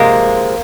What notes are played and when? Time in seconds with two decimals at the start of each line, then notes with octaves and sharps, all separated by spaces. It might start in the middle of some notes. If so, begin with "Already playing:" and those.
Already playing: C3 F3 G#3 A#3